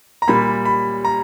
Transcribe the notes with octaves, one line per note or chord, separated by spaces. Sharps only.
A#5
A#2 G3 B5
B5
A#5